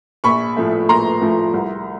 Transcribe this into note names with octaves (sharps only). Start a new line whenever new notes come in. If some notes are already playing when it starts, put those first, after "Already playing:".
A#1 B5 C#6
A2 F3 A3
A#1 A#5 C6
A2 F3 A3
C2